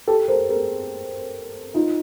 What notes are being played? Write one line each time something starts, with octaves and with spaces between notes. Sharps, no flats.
G4 A4
A#4 C5
G#4 A#4
D#4 F4